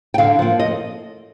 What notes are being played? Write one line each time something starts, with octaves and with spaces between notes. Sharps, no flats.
G5
D3 F5
F3 A#3
D#5